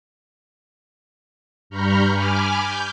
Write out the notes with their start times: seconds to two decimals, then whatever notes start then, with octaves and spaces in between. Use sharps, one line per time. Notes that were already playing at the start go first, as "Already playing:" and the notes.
1.70 G2 A#5 B5 C#6 F6 G6
2.13 G#5 B5 D6 F6
2.60 G6